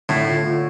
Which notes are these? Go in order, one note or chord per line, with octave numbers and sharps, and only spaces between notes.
A2 D3
F4
F4